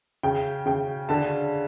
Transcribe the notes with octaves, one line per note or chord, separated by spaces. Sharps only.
C#3 G5
C#3 G5
D3 A5